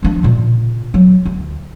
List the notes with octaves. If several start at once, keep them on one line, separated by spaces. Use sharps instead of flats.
F3 D4
A#2 C#3
F#3
D2